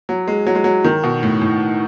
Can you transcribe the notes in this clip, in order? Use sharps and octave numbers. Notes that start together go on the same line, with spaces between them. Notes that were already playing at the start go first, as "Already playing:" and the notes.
F#3
G#3
F#3
G#3
F#3
D#3
B2
A2
A2